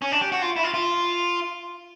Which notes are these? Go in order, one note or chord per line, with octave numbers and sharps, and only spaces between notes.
C#4
D4
G4
F#4
F4
E4
F4
F4